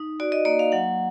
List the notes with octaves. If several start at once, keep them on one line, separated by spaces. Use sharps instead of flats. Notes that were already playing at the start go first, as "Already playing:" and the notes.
Already playing: D#4
F#4 D5
D#5
A#3 D5
F5
F#3 F#5